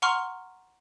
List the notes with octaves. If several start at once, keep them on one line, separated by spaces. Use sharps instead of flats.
F#5 A#5 C6 C#6 F6